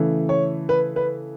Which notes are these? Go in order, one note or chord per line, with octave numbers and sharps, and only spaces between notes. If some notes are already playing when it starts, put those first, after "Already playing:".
Already playing: C#3 E3 A3
C#5
B4
B4